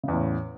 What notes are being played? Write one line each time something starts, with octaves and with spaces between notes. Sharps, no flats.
E2 A2 C#3